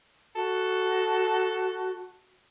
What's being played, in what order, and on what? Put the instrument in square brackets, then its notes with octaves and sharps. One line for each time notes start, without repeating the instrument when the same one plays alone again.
[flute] F#4 [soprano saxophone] A4